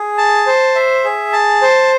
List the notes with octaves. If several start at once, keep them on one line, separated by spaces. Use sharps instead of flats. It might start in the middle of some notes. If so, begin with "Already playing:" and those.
Already playing: G#4
A5
C5
E5
G#4
A5
C5